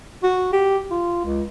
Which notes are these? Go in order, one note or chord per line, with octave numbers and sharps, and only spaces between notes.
F#4
G4
F4
C#2